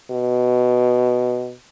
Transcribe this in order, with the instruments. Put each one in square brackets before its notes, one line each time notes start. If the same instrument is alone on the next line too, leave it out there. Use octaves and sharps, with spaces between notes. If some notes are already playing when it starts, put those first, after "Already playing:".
[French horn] B2